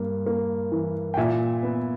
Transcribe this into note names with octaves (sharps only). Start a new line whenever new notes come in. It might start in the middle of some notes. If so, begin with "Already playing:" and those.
Already playing: G2 A#3
A#3
E3
G5
A#2 E5 G#5
B3